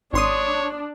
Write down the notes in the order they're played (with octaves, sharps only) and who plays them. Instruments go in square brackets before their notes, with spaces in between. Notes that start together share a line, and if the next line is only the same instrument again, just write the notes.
[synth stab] G#1 C6 D#6 [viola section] D4 [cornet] C#5